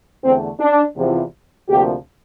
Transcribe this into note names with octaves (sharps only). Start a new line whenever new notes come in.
E2 D3 A3 C4
D4
E2 C3 F3
D2 C3 F3 A#3 G4